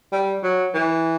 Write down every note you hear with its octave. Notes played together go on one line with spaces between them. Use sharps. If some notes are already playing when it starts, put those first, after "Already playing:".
G3
F#3
E3